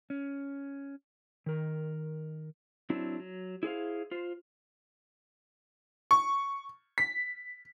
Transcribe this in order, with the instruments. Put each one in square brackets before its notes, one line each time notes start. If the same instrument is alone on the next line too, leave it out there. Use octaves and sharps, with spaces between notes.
[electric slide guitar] C#4
D#3 A#4
F#3 C4 D4 E4
F#3
E4 G#4 C5 F5
F4 C5
[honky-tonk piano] C#6
B6